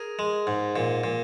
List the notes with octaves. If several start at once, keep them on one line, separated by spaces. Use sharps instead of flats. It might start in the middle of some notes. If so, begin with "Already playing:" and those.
Already playing: G#4 A#4
G#3
G#2
A#2
A#2